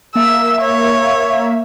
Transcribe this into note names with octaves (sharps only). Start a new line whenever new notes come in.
A#3 E5 E6
C#5